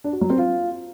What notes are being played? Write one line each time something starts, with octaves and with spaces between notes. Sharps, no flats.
D4
F#4
F#3
C4
F4